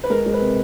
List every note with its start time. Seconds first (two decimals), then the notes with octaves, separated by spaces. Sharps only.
0.04 B4
0.10 G#3 A#4
0.26 G#3
0.34 B4
0.41 C3